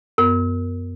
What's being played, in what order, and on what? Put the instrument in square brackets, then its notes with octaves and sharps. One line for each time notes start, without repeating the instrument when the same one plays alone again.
[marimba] F#2 B3 [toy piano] A#4